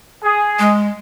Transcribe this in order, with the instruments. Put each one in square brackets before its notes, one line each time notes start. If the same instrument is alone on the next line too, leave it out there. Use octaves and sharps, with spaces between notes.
[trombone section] G#4
[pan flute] G#3